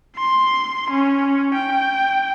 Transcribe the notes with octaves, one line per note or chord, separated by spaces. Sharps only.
C6
C#4
G5